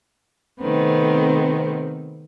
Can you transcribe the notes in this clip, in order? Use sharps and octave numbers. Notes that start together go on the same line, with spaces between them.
C3 D#3 A3 B3 C4